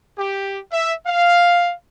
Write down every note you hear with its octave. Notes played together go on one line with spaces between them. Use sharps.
G4
E5
F5